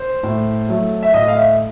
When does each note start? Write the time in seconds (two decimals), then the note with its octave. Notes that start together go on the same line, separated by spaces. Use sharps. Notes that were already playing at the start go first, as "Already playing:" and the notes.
Already playing: C5
0.23 A2
0.69 F#3 A3
1.03 E5
1.13 A2 D#5
1.28 F5
1.36 E5